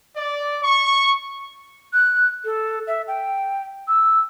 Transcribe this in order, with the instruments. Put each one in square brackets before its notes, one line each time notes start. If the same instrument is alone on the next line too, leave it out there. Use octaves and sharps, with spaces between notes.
[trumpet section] D5
C#6
[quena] F#6
A4
E5
G5
E6